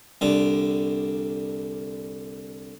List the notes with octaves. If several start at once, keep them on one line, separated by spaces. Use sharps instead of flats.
C2 D3